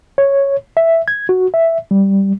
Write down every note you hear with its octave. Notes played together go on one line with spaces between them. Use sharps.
C#5
E5
G#6
F#4
E5
G3